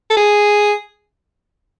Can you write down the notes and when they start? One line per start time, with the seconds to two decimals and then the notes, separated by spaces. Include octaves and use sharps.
0.10 A4
0.17 G#4